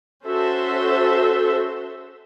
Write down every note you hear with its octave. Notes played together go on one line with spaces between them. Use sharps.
C#4 F#4 A4 C5 E5